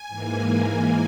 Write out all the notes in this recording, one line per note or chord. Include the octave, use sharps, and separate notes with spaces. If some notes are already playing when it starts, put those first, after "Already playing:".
Already playing: G#5
G#2 E3 A#3